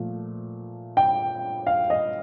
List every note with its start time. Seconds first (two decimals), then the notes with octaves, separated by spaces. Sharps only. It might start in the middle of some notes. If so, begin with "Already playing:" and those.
Already playing: A#2 F3 A3
0.97 G5
1.67 F5
1.90 D#5